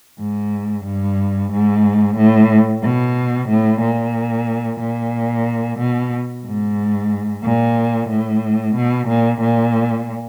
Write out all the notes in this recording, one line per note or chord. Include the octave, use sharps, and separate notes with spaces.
G#2
G2
G#2
A2
B2
A2
A#2
A#2
B2
G#2
A#2
A2
B2
A#2
A#2